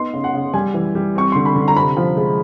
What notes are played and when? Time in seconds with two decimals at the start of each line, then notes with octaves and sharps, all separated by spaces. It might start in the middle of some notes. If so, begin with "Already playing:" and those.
Already playing: B3 D#4 C6
0.13 C#3
0.24 F#5
0.34 C#3
0.54 G3 G#5
0.74 E3
0.95 G3
1.15 C4 C#6
1.32 D3 C6
1.46 B5
1.55 D3
1.68 A#5
1.76 C3 B5
1.97 F3
2.17 G#3